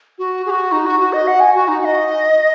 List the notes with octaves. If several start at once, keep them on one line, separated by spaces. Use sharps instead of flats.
F#4
G#4
F#4
D#4
F#4
F#4
D#5
F#5
G#5
F#4
D#4
F#5
D#5